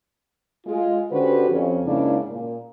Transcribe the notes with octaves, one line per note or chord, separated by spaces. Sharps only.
G#3 F4
D3 C#4 F#4 G4 B4 C5
F2 C#4
G#2 C#3 A#3 C#4 D4 E4
A#2